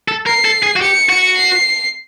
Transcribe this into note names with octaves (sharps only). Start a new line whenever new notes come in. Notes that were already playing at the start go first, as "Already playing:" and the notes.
A4
A#4 C7
A4
G#4
F#4
G4 C#7
F#4
C7